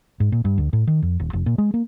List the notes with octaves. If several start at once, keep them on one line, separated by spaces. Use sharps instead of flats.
G#2
A#2
G2
D2
A2
D#3
F2
D#1
F1
A#2
G#3
A#3